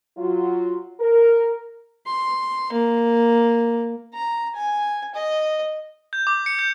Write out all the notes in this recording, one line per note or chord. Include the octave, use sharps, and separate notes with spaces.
F#3 F4
A#4
C6
A#3
A#5
G#5
D#5
G6
D6
C#7
G6